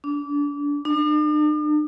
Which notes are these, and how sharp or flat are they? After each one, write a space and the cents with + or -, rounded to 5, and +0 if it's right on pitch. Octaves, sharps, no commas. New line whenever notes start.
D4 -30
D4 +45